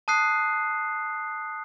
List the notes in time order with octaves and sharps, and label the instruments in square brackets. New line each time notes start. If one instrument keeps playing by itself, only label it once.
[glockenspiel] A5 D#6 F#6 C7